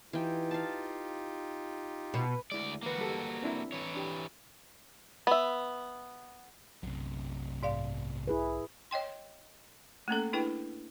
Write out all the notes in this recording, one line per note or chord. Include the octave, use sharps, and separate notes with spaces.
E3 D#4 F4 G4 G5
F5 A5
B2 B4
D2 G#3 E4 D5
D3 E3 A#3 F#4 B4
G3 G4 A4
C4 D4 E4
E3 C#5
D4 G4
B3 E5
B1 F#2 C3
G#2 D5 F5
E4 G#4 B4
C#5 D#5 G5 C6
A3 A#3 C#4 A4
D4 E4 G#4 B4 G5